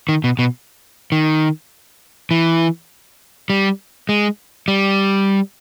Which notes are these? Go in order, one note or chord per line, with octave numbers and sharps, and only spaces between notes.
D#3
B2
B2
D#3
E3
G3
G#3
G3